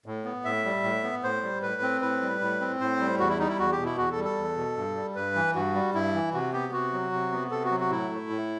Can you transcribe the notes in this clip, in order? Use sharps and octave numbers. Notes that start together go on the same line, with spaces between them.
A2
B3
A2 E5
G3
A2
B3
A2 C5
G3
A2 B4
C4
A2 B4
G3
A2
C4
A2 C5
G3
E2 F#4
E4
G3 D#4
E4
E2 F#4
G4
B2
E4
E2 F#4
A4
G3
A4
E2
B2
G2
G3
G2 B4
E3
G2 F#4
G3
G2 E4
E3
C3 F#4
B3 G4
C3 F#4
F#3
C3
B3
C3 A4
F#4
F#3
F#4
A2 E4
A3
A2